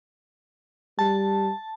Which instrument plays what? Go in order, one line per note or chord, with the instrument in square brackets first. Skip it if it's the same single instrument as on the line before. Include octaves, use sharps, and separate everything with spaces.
[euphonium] G3 [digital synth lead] A5